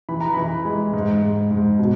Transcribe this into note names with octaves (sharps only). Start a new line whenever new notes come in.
E3 B5
A#5
E3 B5
G#3
G#2
G#2
G#2
B2